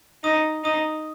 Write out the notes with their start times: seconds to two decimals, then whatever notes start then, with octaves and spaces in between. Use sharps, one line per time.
0.24 D#4 D#6
0.64 D#4 D#6